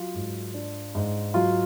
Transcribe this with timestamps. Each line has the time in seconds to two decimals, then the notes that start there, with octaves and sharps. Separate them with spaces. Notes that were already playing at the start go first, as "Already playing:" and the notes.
Already playing: F#3 F4
0.14 G#2
0.54 D4
0.95 G#2
1.34 F#3 F4